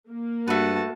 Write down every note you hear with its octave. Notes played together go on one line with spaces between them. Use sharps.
A#3
G2 A3 F#4 B4 A5